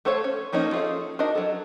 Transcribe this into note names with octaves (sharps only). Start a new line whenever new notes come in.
A3 A4 C5 C#5 F5
C#4
F3 A#3 C#4 D#4
F4 G#4 A4 F5
D4 D#4 F#4 A#4 D#5
F#3 A4